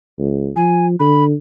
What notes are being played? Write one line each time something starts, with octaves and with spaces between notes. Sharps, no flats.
C#2
F3 G#5
D3 B5